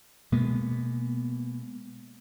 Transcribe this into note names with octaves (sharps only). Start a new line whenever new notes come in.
B2 G#3 A#3 B3